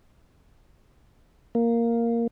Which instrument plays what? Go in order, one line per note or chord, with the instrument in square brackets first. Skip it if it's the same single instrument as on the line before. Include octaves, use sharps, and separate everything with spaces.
[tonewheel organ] A#3